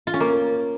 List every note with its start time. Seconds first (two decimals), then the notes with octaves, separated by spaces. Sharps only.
0.07 F4
0.14 C#4
0.20 A#3